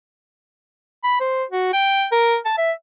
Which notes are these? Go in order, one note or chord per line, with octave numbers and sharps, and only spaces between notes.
B5
C5
F#4
G5
A#4
A5
E5